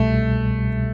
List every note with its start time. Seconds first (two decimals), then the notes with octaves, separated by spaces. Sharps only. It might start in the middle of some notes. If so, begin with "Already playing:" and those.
Already playing: C2 B2 G3 A3